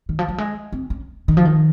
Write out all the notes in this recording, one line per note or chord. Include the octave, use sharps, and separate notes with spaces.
D#3
F3
F#3
G#3
C4
C#4
D#3
F3
D#3